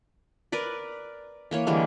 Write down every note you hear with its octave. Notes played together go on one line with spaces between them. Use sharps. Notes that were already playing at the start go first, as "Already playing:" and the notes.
A#4 B4 D5
E3 A#3 C#5
D3 E3 G3 G#3